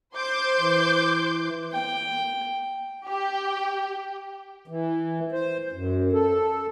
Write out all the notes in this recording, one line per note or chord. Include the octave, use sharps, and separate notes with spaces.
C5 C6 D6 G6
E3
G5
G4 G5
E3
C5
F#2
A4